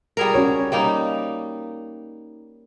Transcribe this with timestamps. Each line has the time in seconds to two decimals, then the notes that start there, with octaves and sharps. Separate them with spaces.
0.17 G3 G#4 A#4
0.34 C#4 F#4 C#5
0.72 G3 A#3 D#4